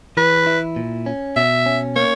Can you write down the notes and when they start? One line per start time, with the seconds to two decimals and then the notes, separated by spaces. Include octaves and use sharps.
0.17 E3 B4
0.47 E4
0.76 A#2
1.06 C#4
1.36 B2 E5
1.66 C#4
1.96 A#3 C#5